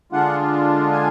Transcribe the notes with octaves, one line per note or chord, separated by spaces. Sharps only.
D3 G#3 D4 F4 F#5
G#5